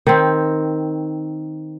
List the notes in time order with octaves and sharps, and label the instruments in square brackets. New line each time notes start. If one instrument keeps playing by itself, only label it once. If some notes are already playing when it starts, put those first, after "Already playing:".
[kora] D#3 C4